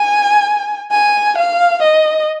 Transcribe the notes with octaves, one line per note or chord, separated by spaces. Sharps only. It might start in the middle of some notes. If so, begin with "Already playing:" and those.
Already playing: G#5
G#5
F5
D#5